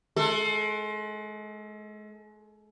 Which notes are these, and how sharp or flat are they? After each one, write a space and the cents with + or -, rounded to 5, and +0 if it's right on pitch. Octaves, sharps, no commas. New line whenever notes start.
G#3 +35 A4 +15